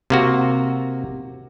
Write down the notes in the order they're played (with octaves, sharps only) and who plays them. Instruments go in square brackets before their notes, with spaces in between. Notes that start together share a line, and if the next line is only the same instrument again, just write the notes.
[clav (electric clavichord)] C3 A#3 F#4